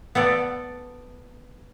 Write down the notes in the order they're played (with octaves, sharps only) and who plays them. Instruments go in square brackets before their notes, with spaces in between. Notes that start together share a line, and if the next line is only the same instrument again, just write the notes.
[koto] B3 A4 D5